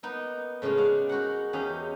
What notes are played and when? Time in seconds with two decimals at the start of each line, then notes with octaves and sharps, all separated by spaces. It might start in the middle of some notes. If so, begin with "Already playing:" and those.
0.03 A#3 B3 D#4
0.62 A2 C#3 G#3 F4
0.77 G#4 D5 F5 F#5
1.09 D#4 F#4 A#4 F#5
1.53 E2 C#4 D#4 G4 D#5 F5